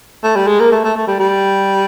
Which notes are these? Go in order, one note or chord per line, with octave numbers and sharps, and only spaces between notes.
A3
G3
G#3
A#3
A3
A3
A3
G3
G3